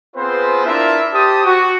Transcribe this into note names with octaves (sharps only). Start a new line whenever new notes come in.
B3 C4 F4 G#4 B4 C5
D4 E4 F4 A#4 E5
G4 C5 A5 D#6
F#4